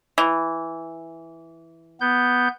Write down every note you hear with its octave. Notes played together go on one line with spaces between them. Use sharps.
E3
B3 G6